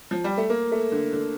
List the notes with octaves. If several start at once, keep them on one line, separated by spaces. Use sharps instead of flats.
F3
G3
A3
A#3
A3
D3
D3